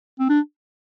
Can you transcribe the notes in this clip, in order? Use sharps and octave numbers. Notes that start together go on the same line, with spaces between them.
C4
D4